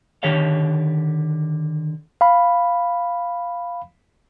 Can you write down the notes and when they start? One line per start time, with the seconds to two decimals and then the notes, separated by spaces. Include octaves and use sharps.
0.23 D3 D#3 G4 A4 C#5 F5
2.21 F5 B5